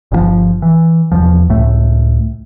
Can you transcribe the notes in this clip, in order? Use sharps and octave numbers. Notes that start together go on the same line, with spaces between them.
G1 C#3 F3
E3
F1 B1 E2 F3
C#2 A2 A3